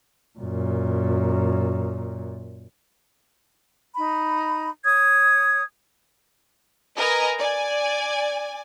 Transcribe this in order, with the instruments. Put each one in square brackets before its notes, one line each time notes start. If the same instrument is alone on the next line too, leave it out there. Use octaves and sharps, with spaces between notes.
[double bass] F#2 A#2
[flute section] D#4 B5
C#5 D#6 G#6
[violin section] A#4 B4 D#5 G#5 A#5
D5 G#5